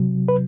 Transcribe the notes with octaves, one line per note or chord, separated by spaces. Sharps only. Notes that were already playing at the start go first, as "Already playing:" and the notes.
Already playing: C3 F#3
B4